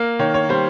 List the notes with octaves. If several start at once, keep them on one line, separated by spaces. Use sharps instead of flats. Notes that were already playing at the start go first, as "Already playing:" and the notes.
Already playing: A#3 A#4
D#3 C#5
C#5
G3 C5